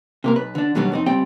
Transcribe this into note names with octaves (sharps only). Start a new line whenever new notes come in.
C3 A#3 A#4
B1 B4
D3 D4
D#2 B2 D3 F#3 G3 B3
F2 C4 D#4
C#2 G3 C4 G5